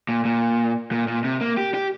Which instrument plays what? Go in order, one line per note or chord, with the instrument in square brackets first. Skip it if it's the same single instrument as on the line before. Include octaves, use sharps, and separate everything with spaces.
[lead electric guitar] A#2
A#2
A#2
A#2
C3
A#3
G4
G4